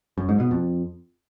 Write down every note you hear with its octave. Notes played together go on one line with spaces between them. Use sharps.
F#2
G#2
B2
F2